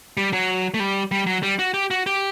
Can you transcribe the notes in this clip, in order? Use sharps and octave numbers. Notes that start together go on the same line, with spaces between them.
G3
F#3
A3
G3
G3
F#3
G3
F#4
G4
F#4
G4